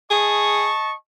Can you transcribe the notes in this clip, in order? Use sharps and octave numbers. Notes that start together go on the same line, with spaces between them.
G#4 D#5 A5 C#6